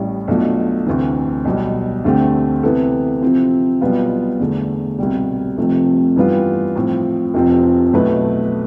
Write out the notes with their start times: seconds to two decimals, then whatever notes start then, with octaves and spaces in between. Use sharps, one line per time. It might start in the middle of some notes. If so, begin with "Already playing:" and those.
Already playing: A1 A2 G3
0.28 B1 B2 A3 D4 F4
0.86 D2 C3 E3
1.45 B1 B2 G3
2.04 D2 D3 A3 C4 G4
2.63 C3 E3 B3 E4 A4
3.22 C3 F3 C4 E4
3.81 B1 B2 G3 B3 F4
4.40 E2 D3 A3
4.99 C2 B2 G3
5.57 F1 F2 C3 F3 A3
6.16 G2 E3 G3 B3 F4
6.75 A2 F3 C4
7.34 F1 F2 C3 F3 C4
7.93 B1 B2 A3 E4 B4